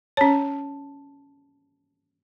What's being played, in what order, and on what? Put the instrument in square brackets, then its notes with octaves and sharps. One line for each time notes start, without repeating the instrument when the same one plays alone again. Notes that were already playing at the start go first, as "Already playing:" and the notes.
[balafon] C#4 C#5 [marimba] A5